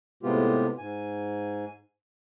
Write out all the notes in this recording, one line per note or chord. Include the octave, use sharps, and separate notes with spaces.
A2 C3 G#3 B3 F4 G4
G#2 G#5